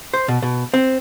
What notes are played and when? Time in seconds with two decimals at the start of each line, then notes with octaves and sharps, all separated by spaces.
0.14 C5
0.28 B2
0.42 B2
0.74 C4